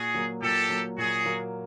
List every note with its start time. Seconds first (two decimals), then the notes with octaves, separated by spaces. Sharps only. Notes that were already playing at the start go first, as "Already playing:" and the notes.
Already playing: A#2 F#4 G#4
0.14 F#3 A#3
0.42 A#2 G4 A4
0.70 F#3 A#3
0.98 A#2 F#4 G#4
1.25 F#3 A#3